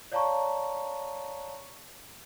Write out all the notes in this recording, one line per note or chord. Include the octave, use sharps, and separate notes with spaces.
C#5 D5 F5 A5 A#5 C#6